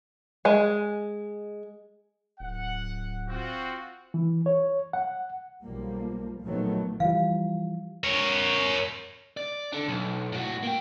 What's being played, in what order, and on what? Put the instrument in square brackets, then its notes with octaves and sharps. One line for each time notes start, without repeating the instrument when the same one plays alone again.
[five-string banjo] G#3 G#5
[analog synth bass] D1 [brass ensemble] F#5
[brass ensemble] C4 F4 F#4
[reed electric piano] E3
C#5
F#5
[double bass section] B1 F3 G3 A#3
A#2 D#3 F3 F#3 A3 B3
[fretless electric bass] E3 F3 G3 [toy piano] F5
[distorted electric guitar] A#4 C#5
[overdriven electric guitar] D5
D4 A4
B1
A2 F#4
A#3 G5